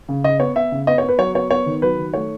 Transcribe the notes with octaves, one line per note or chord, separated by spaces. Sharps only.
C#3
C#3 D#5
B3 C#5
B3 E5
C#3
B3 D#5
C#5
B3
B4
F#3 C#5
B3 C#5
B3 C#5
D#3
F#3 B4
D#3
A3 C#5